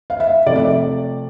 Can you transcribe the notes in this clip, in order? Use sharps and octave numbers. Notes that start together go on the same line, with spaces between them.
F5
E5
C3 F3 A3 D5
E5
D5